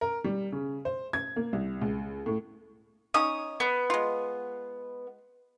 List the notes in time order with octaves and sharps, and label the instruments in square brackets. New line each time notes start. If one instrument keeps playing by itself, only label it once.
[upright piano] A#4
G3
C#3
C5
G#6
A#3
C2
C#2
A2
[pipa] C#4 D#4 C#5 [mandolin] D#6
[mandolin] B3
[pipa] G#3 F4